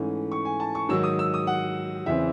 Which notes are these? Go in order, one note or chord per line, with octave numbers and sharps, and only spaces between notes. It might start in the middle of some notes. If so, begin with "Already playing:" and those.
Already playing: G#2 E3 A3 C#4
C#6
G#5
A5
C#6
G#2 D#3 F#3 E6
D#6
E6
D#6
F#5
E2 C#3 E3 C4 E5